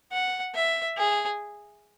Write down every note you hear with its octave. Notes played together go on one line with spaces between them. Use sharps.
F#5
E5
G#4